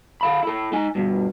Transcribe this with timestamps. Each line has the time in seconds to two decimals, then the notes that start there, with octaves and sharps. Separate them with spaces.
0.21 A4 F5 B5
0.43 E4 A4
0.73 D#4 G#5
0.95 G2 B2